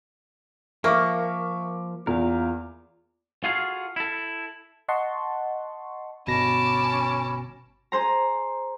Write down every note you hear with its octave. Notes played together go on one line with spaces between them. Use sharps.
F3 A#3 E5 C#6 D6
E2 F4 A#4 F5
F4 F#4 G#4 A4 F5
E4 A4
D#5 F#5 A5 C6 C#6
G1 B2 C#4 A5 B5 D6 A#6
G#4 C5 A#5